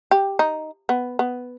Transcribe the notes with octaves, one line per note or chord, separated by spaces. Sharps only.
G4
D#4
B3
B3